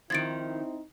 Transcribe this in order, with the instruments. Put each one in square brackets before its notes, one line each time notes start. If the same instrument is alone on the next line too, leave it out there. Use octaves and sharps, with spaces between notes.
[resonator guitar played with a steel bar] D#3 F3 [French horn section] C4 D#4 E4 [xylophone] G#6 A6 D7